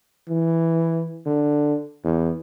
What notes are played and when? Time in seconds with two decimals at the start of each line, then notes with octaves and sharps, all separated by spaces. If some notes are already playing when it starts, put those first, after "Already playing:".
0.29 E3
1.26 D3
2.04 E2